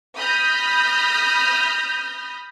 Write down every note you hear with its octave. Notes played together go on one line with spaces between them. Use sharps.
B5 D#6 F6 G6 A#6